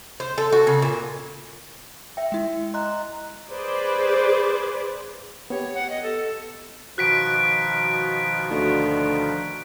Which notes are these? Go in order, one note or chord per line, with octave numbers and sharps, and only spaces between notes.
C5
A4
F#4
C#3
A#2
E5 G5
G#3 E4
D#5 A#5 C6 F#6
G#4 B4 C5 D5
B3 G4 C#5
F#5
D#5
A4
B2 D#3 F3 F#4 F#6 B6 D7
D2